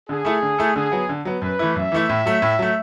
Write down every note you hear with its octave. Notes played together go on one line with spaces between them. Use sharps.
D3 G#4
A3 E4 A4
D3
A3 E4 A4
D3 G#4
F#3 B3
D3
F#3 B3
F#2 B4
E3 A3 E4
F#2 E5
E3 A3 E4
A2
F#3 A3
A2
F#3 A3